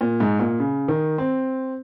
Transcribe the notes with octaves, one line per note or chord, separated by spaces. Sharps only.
A#2
G#2
A#2
C#3
D#3
C4